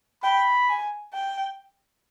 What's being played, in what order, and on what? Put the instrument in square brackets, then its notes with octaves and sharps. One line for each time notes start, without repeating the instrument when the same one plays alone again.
[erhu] G5 [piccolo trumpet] B5
[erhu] G#5
G5